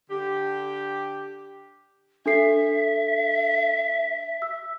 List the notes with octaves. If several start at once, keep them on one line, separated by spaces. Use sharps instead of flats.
D3 G4
D4 A4 E5 C7
E6